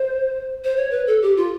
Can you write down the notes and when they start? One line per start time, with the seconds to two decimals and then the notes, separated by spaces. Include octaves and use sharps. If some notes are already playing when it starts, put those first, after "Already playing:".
Already playing: C5
0.64 C5
0.77 C#5
0.91 B4
1.07 A4
1.22 G4
1.37 F4